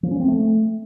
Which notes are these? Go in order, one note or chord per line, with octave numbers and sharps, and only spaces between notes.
F3
C#4
C4
A3